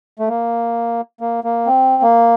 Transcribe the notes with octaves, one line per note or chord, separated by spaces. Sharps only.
A3
A#3
A#3
A#3
C4
A#3